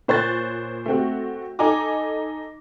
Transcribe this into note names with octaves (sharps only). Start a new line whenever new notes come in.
A#2 C5 C#5 F#6 A6
A3 C4 F#4
D#4 A4 G#5 A#5 D6